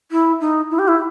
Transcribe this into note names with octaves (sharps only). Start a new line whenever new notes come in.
E4
D#4
E4
G4
E4